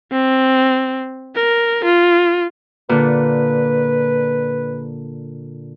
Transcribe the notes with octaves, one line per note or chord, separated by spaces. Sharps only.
C4
A#4
F4
A#2 D3 B4